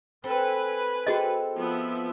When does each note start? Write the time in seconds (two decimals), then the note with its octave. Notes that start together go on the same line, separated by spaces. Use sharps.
0.24 C4 A4 B4 G#5
1.07 C4 F#4 G#4 A4 D#5
1.58 F3 B3 E5